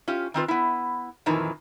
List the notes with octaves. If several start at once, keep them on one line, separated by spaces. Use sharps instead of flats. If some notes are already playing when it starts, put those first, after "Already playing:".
C#4 F4 G4
D#3 C4 F4 B4
B3 E4
F2 A#2 D#3 E3